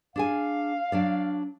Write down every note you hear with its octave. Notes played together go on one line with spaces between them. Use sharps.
D4 G#4 F5 G#5
F#3 D4 D5